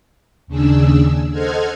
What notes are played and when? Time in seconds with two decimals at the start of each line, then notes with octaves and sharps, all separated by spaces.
0.47 D#2 C#3 D4 G#4 E6
1.32 A4 C5 D#5 F#5 F6 G#6